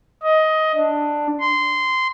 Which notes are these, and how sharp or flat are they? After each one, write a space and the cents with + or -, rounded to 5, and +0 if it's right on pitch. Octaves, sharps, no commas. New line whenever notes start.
D#5 +15
D4 +10
C6 -15